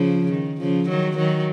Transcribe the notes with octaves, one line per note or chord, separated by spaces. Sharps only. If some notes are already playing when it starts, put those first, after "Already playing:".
Already playing: C#3 F3
D#3
C#3 F3
D#3 F#3
D#3 F#3